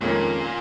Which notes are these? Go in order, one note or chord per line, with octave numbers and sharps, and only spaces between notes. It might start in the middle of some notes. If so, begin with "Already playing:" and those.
F2 A#2 D#3 G#3 C#4 F4